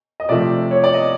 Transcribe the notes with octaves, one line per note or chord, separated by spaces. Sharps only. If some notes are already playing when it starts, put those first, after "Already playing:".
D#5
C3 F3 A3 C4 D5 E5
C#5
D5
D#5